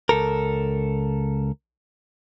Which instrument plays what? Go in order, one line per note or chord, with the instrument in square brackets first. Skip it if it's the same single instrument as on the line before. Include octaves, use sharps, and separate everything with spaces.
[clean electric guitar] C#2 A4 A#4